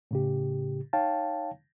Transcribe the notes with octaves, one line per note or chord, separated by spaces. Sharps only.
A2 C#3 G4
D#4 C#5 F5 G5 A5